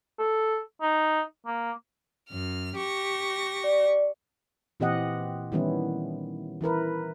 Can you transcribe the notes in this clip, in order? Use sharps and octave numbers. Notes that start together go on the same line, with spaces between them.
A4
D#4
A#3
F#2 F6
G4 C#6 A#6
D5
A#2 E3 C4 G4 D#5 F#5
D#3 E3 G3 B3 C#4 E4
E3 E4 A#4 B4